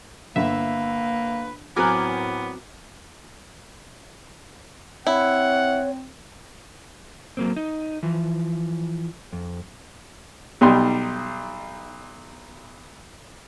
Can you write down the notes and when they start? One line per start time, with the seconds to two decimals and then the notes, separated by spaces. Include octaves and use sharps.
0.36 G1 A#3 B4 E5
1.76 A2 F#3 B3 C4 A#4 G#5 D6 F#6
5.07 C4 E4 C#5 F#5
7.37 F#3 A#3 C4
7.56 D#4
8.03 E3 F3
9.33 F2
10.61 B1 G3 D#4 C6